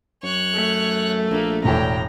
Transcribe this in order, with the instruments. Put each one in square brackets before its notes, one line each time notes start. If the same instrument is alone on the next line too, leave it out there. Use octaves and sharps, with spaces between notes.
[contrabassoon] F#2 [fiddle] C#5 F#6
[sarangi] A3
[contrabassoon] A#1 [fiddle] A#3
[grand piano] E1 E2 A2 [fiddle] G4 [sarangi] A#5